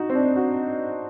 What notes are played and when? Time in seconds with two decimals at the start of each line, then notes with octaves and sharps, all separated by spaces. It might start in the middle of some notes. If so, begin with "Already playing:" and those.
Already playing: D#4 F#4
0.10 C4
0.15 D4
0.36 F#4